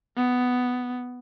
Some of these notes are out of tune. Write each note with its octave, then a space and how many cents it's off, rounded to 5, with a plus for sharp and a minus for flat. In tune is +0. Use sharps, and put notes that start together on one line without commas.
B3 +10